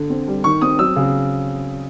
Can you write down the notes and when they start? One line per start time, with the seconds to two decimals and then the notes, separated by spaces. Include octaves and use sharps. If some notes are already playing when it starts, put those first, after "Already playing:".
Already playing: D3
0.10 C4
0.28 G3
0.44 D#3 C#6
0.61 C4 D#6
0.79 F#3 E6
0.96 C#3